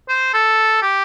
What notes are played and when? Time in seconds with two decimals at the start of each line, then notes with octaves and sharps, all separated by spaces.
0.08 C5
0.34 A4
0.82 G4